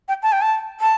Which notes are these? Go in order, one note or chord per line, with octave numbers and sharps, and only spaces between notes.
G5
A5
G5
A5
A5